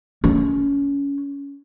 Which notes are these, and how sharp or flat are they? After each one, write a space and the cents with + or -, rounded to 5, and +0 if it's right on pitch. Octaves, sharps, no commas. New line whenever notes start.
C#4 +20